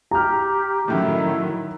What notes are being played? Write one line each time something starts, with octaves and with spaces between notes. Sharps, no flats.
G4 A#5 F6
F#2 A2 D#3 F#3 E4